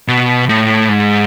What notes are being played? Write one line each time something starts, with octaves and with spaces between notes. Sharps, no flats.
B2
A2
G#2